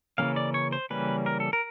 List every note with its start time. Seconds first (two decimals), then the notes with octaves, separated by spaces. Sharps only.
0.18 C#3 E3 G3 A#3 C#4 F5
0.36 D5
0.54 C#5
0.72 C5
0.90 C#3 E3 G3 A#3 C#4 B4
1.26 A#4
1.40 A4
1.53 A#4